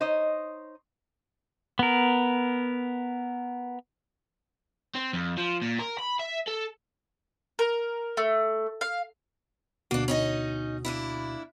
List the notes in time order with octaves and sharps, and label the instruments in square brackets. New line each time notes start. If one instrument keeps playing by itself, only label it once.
[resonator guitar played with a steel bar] D#4 C5 C#5 D#5
[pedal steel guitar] B3 A#4
[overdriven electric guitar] C4
F2
F3
A#2
A#4
B5
E5
A4
[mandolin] A#4
A3
F5
[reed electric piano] D2 B2 F#4 [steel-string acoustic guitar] A#3 D4
[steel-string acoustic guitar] C#4 D#4 D#5
A#3 D4 E4